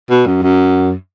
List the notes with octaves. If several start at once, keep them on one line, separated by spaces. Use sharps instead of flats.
B2
F#2
F#2